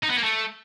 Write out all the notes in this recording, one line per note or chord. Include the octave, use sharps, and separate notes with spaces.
D#4
B3
A#3
A3